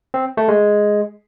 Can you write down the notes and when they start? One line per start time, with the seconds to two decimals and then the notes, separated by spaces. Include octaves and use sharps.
0.14 C4
0.37 A3
0.48 G#3